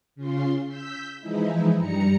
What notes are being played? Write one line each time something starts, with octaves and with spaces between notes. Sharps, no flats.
C#3 C#4 F4 C6
E6 G6 B6
E3 F3 G#3 D#4 E4
G2 G3 A#5 C#7